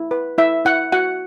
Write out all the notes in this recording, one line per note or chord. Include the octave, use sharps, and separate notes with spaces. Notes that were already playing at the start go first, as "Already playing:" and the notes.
Already playing: E4
B4
E4 E5
E4 F#5
F#4 F#5